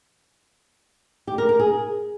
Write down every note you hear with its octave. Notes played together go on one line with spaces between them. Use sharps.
G4
A#4
A#4
G#4